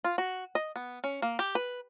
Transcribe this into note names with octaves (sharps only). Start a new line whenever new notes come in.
F4
F#4
D#5
B3
C#4
A#3
G4
B4